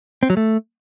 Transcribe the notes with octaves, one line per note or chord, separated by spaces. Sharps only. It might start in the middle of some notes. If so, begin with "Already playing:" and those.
C4
F#3
A3